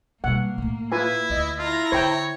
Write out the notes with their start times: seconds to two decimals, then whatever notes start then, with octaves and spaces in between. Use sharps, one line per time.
0.24 B2 G3 A#3 F#5
0.58 A2 A3
0.92 E4 F4 B4 G#5
1.30 D2 D#5
1.58 E4 F4 A#5 A#6
1.92 D3 C5 C#5 G5